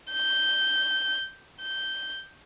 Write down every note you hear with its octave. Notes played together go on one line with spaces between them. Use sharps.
G6
G6